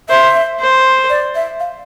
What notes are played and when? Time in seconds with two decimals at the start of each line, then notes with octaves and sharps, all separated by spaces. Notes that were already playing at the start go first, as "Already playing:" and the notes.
0.09 C5 E5
0.60 C5
1.10 D5
1.35 E5
1.60 F5